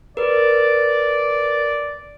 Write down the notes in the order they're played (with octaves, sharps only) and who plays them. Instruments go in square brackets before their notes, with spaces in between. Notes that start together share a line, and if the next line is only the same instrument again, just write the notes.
[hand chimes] A#4 B4 [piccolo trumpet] D5